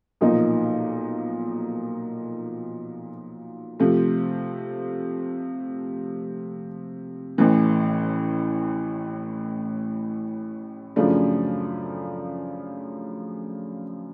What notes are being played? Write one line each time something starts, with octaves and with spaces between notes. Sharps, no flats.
B1 A#2 F3 A#3 D#4
C3 F3 A3
A1 A2 E3
F#2 C#3 F3 A3 D4